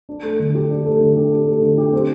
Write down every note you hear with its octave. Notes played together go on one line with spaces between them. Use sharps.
D4
A3
D3
G4
D4
A3
D3
G4
D4
A3
D3
G4
C4